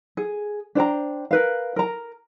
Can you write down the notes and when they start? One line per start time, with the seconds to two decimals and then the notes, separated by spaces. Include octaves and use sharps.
0.17 G#4
0.75 D4 C5 G5 A#5
1.31 A#4 B4 F5
1.76 A#4 A#5